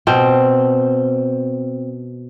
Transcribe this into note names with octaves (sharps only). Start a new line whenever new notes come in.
B2 C4